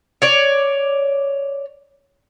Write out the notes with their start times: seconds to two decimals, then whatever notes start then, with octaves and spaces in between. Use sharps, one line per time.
0.22 C#5 D5